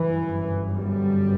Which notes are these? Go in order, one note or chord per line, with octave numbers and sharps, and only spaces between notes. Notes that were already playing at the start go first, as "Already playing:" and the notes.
Already playing: G1 F#2 E3
G3